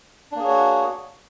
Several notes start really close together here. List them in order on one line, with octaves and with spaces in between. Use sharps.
D4 A#3 G#4 C#5 F#4